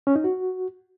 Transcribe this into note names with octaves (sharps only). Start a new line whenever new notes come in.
C#4
D#4
F#4